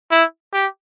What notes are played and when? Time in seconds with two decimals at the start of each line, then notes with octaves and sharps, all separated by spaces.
0.11 E4
0.53 G4